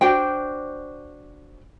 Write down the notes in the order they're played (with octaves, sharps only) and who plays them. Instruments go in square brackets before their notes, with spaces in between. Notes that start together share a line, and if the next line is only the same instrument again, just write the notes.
[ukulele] D4 F#4 C5 G5